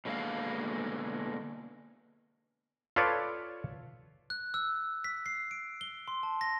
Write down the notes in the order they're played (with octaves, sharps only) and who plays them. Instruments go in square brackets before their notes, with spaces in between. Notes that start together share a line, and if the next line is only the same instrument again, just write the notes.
[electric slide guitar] B2 D3 G#3 A#3 F5
[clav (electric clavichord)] F4 A4 B4 C#5 D5
[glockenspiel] F#6
E6
B6
C7
D7
G7
C6
A5
A#6